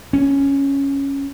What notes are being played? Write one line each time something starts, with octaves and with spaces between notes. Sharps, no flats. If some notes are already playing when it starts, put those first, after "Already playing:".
C#4